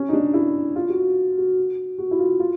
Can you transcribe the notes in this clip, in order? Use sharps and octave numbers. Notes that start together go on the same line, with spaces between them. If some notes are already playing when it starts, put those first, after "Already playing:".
Already playing: C#4
D#4
D4
E4
F4
F#4
F#4
F#4
E4
F4
F4